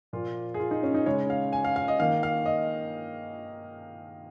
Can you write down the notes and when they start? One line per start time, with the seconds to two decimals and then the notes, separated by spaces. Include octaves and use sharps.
0.13 A#2 F3 A#3 F4
0.54 G#4
0.60 F4
0.71 D#4
0.83 C#4
0.94 D#4
1.06 C#3 G#3 C#5
1.30 F5
1.53 G#5
1.65 F5
1.76 F5
1.88 D#5
2.00 D#3 A#3 F5
2.23 F5
2.46 D#5